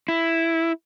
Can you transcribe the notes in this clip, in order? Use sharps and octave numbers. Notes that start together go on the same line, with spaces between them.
E4